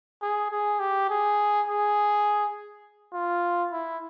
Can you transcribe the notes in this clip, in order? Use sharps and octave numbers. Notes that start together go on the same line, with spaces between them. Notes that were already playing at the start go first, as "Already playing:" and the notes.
G#4
G#4
G4
G#4
G#4
F4
E4